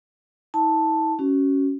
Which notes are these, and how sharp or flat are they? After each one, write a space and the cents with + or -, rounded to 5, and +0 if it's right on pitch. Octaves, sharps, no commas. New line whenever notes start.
E4 -45 A5 +0
C#4 +0 F#4 +30